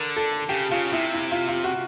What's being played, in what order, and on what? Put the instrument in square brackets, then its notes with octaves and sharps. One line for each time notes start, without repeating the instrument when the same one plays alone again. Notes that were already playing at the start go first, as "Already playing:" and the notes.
Already playing: [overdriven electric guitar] D3 [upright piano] A#4
[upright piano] A4
[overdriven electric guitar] C#3 [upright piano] G4
[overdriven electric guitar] C#3 [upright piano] F4
[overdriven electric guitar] C3 [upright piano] E4
[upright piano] E4
F4
F4
F#4